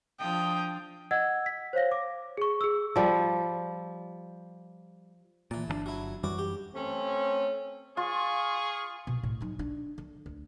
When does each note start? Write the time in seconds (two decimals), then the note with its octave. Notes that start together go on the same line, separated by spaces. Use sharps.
0.20 F3 D4 G5 D#6
1.11 D#5 F#5 E6 G#6
1.46 B6
1.73 C5 C#5 F5 A#6
1.91 D6
2.37 G#4 C#6
2.61 G#4 E6
2.96 F3 G3
5.51 A#2 E3 A5
5.68 G1 D3 D4
5.86 F#3 E4
6.24 F#2 E3 G3 F#4 D6
6.38 G4
6.74 A3 C4 C#4
7.97 F4 G#4 C#6
9.07 B2
9.23 A2
9.41 F#3 D#4
9.59 D4
9.98 D3
10.26 D2